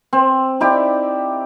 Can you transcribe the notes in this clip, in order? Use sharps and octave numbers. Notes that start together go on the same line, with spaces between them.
C4
D#4 E4 G4 D5